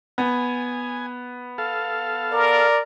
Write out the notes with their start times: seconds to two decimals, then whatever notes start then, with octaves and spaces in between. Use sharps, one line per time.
0.18 B3 G#5
1.58 A4 F5
2.33 A#4 D5